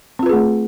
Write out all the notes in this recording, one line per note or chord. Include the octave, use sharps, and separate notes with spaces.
A3 C4 F4 G#4 B4